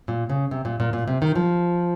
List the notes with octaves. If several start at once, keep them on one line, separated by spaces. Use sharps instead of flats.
A#2
C#3
C3
A#2
A#2
A#2
C3
D#3
F3